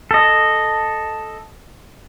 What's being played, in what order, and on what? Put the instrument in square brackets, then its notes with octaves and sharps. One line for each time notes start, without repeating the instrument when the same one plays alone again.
[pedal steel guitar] A4 D#5